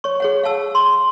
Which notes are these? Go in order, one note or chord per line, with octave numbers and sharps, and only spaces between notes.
C#5 C#6
G#4 C#5 F#5
F5 F#5 A5 E6
C6